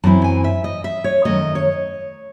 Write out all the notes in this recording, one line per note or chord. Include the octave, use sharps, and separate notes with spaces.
F#2 E3 C4 E4 A5
G#5
E5
D#5
E5
C#5
F#2 D#3 A3 D#5
C#5